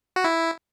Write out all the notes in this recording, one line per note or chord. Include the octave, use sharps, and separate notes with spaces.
F#4
E4